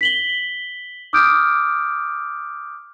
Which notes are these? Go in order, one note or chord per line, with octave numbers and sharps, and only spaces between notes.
B6 F#7 G7
D6 D#6 F6 G6 D7